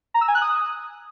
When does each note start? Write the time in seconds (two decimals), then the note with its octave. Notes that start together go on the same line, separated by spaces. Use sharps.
0.14 A#5
0.21 E6
0.28 G#5
0.35 F#6
0.42 D#6